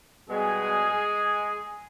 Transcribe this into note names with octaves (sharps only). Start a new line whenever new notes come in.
B2 G3 G#3 B3 G#4